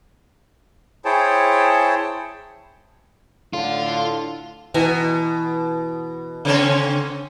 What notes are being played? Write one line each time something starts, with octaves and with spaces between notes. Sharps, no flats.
E4 G#4 C5 C#5 G5 A5
A2 D3 F4
B2 E3 G#5 A#5
C#3 C4 C#4